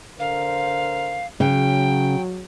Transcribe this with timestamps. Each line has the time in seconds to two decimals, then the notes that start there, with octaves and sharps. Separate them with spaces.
0.20 D3 A#4 C5 F5
1.40 C#3 F#3 G5